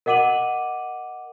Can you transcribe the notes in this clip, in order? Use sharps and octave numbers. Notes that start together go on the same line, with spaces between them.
A#4 D#5 F#5 D6 D#7 F#7